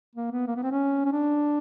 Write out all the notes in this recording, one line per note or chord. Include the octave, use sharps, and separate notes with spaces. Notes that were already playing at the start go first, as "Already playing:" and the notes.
A#3
B3
A#3
B3
C4
C#4
C#4
D4